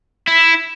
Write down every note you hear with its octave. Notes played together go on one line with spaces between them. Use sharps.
E4